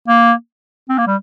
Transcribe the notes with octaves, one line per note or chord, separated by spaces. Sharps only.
A#3
C4
A#3
G3